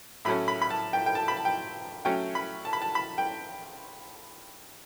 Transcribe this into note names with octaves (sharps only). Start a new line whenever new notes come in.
A2 F#3 A3 C#4 B5
B5
B5
A5
G5
G5
A5
B5
A5
G5
F#3 A3 C#4 G5
B5
A5
B5
A5
B5
G5